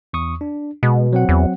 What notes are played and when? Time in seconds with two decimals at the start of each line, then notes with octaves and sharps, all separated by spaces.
0.13 E2 C#6 D#6
0.41 D4
0.83 B2 G#3
1.13 F#3 C4 F#5
1.29 E2